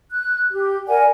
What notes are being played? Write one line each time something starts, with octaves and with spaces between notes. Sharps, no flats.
F#6
G4
A#4 D5 F#5 G#5